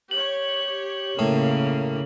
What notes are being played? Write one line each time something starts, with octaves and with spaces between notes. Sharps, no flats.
G4 C#5 F#7
A2 C#3 A#3